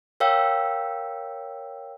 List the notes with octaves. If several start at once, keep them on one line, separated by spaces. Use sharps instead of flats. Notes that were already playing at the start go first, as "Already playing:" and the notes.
A#4 C#5 F5 G5 E6